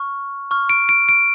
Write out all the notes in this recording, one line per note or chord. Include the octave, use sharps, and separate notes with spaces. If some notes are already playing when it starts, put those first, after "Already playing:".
Already playing: C#6 F6
C#6 F6
D7
D7
D7